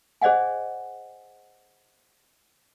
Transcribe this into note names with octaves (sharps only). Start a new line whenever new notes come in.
G#4 C5 D5 D#5 F#5 G#5